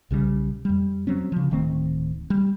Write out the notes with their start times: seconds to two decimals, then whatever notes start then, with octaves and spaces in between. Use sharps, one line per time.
0.11 B1 C#3 E3 G3
0.65 F2 G3
1.07 F#3 C4 C#4
1.32 C#3 F3
1.51 D1 D#3 A3 C4
2.30 G3